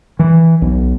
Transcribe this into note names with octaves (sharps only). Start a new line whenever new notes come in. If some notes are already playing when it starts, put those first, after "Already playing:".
E3
B1